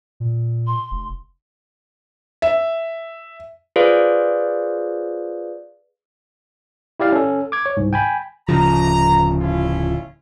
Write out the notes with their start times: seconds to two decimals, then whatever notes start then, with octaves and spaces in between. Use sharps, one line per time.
0.20 A#2
0.67 C6
0.91 F1
2.42 E5
3.76 F4 G#4 B4 C5 D5 F5
7.00 E4 G4 D5 F5
7.12 C#4 A4
7.52 D6 G#6
7.66 C#5
7.77 C2 G#2
7.93 G5 G#5 B5
8.49 D1 C#3 F3 A#5
9.40 C#4 E4 F4